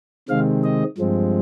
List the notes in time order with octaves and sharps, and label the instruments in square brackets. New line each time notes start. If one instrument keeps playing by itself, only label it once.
[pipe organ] C3 D#3 G#3 C4 F5
D#5
G2 F3 G#3 C4